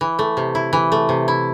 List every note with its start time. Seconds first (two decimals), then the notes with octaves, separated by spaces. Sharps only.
0.01 E3
0.19 A3
0.37 C3
0.55 E4
0.73 E3
0.92 A3
1.09 C3
1.28 E4